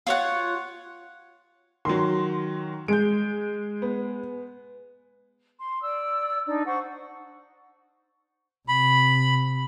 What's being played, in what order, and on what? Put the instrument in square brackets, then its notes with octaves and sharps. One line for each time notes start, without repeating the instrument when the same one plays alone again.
[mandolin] F4 C#5 F#5
[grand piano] D#3 F#3 [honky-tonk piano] C6
[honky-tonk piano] G#3 [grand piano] G6 D7
[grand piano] B3
[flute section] C6
D5 E6
D4 D#4 D5
C5 F#5 C#6
[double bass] C3 [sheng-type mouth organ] B5